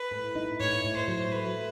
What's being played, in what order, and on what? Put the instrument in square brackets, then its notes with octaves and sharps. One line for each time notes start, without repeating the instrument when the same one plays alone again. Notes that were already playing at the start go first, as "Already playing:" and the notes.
Already playing: [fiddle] B4
[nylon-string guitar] A2
D#4
[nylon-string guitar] A2 [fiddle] C#5
[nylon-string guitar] A2
[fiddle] C5
[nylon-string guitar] F#3
[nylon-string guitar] A3 [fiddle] B4